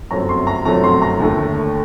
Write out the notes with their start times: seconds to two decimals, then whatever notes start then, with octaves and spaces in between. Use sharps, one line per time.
0.10 G1 F#2 F#3 A3 C4 A#5
0.29 C6
0.47 A#5
0.65 G1 F#2 F#3 A3 C4 A#5
0.84 C6
1.02 A#5
1.20 D#2 D3 A3